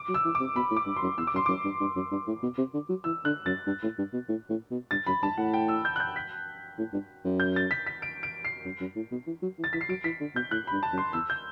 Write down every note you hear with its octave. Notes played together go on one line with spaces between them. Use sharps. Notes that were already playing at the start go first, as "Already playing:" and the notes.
Already playing: D6
F#3
E6
E3
D6
C3
B2 B5
A2
D6
G2
C6
F#2
E2 E6
D6
F#2 C6
F#2 D6
G2
G2
F#2
G2
A2
B2
C3
D3
F#3
E3 E6
D3 F#6
F#2 A6
G2
A2
G2
B2
A2
A2
B2
G2 A6
F#2 B5
G2 A5
A2 F#5
G5
E6
G6
F#6
G6
B6
A2
G2
F#2
G6
A6
B6
B6
D7
D7
C7
F#2
F#2
A2
B2
E3
F#3
E3
A6
E3 B6
C7
F#3 D7
E3 B6
D3
B2 G6
A2 F#6
G2 B5
A5
F#2
C6
E2 E6
G6